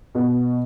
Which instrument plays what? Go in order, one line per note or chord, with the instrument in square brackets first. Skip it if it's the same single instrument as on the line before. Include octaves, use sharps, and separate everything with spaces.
[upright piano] B2